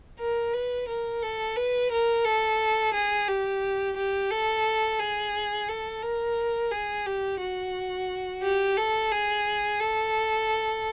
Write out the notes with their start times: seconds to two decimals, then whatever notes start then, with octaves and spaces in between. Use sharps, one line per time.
0.19 A#4
0.54 B4
0.88 A#4
1.22 A4
1.56 B4
1.91 A#4
2.25 A4
2.93 G#4
3.28 G4
3.97 G4
4.31 A4
4.99 G#4
5.68 A4
6.02 A#4
6.71 G#4
7.06 G4
7.40 F#4
8.42 G4
8.77 A4
9.12 G#4
9.80 A4